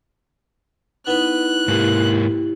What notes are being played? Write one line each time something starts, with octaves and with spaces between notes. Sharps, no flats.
B3 D#4 E4 B4 F#6
G#2 A#3 E4 G4